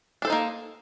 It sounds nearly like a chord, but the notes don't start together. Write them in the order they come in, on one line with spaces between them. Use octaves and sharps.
D4 A4 C5 D#4 A#3